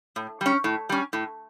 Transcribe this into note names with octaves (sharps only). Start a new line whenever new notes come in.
A2
G3 C#4
A2
G3 C#4
A2